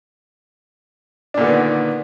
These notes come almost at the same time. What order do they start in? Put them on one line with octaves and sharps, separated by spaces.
D4 A#2 D3 B3 D#3